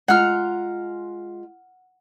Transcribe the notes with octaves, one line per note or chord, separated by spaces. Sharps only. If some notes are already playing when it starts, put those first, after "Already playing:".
G#3 F4 F#5 A#5 F6